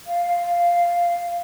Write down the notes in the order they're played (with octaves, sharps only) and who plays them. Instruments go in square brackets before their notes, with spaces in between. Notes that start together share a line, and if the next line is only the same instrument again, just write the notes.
[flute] F5